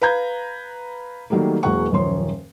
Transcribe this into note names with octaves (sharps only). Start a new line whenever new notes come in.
B4 F5 A#5 G6 G#6
D#3 F#3 G3 A3 A#3
E1 F#3 G#3 A#3 F#5 C#6
D#1 F#2 F3 C#5 C6